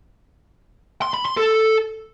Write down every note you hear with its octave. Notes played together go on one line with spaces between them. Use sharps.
C6
B5
C6
A4